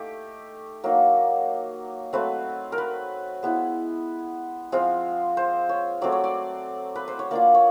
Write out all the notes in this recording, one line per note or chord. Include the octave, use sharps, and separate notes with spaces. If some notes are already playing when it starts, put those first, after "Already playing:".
Already playing: A3 D#4 G4
F#3 A#3 D#4
F#3 A3 C4 B4
A#4
B4
G#3 B3 E4
F3 G#3 C4 F4
C5
C#5
F#3 A3 C4 D5
C#5
D5
B4
C5
C#5
A#3 D4 F4 D5
C#5